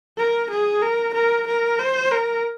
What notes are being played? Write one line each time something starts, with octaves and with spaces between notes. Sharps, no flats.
A#4
G#4
A#4
A#4
A#4
C5
A#4